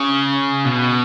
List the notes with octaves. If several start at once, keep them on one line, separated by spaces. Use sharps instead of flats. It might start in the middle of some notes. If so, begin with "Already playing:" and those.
Already playing: C#3
B2